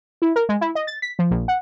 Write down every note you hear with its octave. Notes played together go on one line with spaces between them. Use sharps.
E4
A#4
G#3
E4
D#5
A6
B6
F3
A#1
F#5